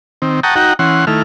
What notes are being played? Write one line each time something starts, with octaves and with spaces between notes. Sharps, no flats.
D#3 C4
F#5 G5 A5 A#5 C#6 D#6
D#4 F#4 F#5 G5 A#5
E3 C#4 F#5 C6
D#3 A3 E4 F6